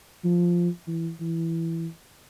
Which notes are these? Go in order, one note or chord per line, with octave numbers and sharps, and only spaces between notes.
F3
E3
E3